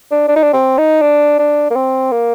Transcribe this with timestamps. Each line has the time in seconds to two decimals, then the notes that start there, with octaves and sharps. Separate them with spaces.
0.11 D4
0.28 D4
0.36 D#4
0.43 D4
0.53 C4
0.78 D#4
1.02 D4
1.39 D4
1.70 A#3
1.76 C4
2.12 A#3